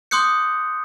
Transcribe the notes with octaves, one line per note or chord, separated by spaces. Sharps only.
C6 D6 D#6 F#6 G6 C#7